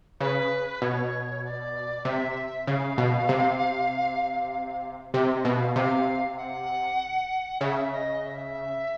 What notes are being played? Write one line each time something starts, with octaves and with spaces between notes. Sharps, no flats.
C#3 B4
B2 C#5
D5
C3 E5
C#3 F5
B2
C3
C3 E5
D#5
B2
F5
C3 F5
F#5
C#3 E5
D#5
E5